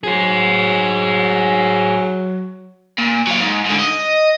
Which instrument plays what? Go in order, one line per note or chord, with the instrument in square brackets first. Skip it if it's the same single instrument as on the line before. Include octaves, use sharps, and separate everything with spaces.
[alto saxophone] F#3 [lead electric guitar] G#4 C5
[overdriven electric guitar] A#2
F#3 F5
G#2
G#2 D3
D#5